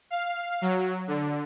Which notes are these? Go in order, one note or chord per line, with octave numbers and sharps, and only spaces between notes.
F5
F#3
D3